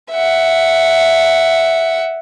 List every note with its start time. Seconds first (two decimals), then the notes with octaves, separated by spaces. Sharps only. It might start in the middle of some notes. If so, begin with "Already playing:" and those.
0.12 E5 F#5